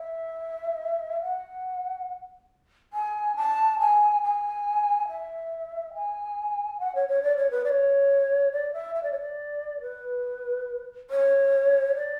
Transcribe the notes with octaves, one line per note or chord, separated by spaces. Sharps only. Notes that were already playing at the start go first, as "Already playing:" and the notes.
Already playing: E5
F#5
G#5
A5
G#5
G#5
E5
G#5
F#5
C#5
C#5
D5
C#5
B4
D5
C#5
D5
E5
E5
D5
C#5
D5
B4
C#5
D5